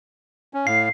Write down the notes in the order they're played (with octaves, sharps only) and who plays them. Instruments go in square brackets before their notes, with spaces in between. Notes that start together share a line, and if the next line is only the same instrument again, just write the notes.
[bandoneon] C#4
[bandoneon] A2 F5 [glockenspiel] C7